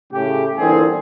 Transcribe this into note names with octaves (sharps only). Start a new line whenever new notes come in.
A2 C#3 G4
G1 A#2 D3 E3 C4 G#4